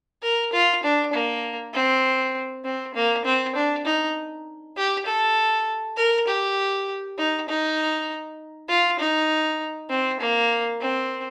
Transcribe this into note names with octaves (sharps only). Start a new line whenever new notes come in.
A#4
F4
D4
A#3
C4
C4
A#3
C4
D4
D#4
G4
A4
A#4
G4
D#4
D#4
F4
D#4
C4
A#3
C4